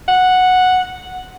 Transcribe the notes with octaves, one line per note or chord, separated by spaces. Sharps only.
F#5